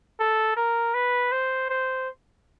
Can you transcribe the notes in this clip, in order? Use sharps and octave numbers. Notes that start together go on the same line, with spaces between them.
A4
A#4
B4
C5
C5